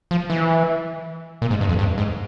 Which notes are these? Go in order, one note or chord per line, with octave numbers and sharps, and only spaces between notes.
F3
E3
A#2
G#2
G2
F2
G2
G#2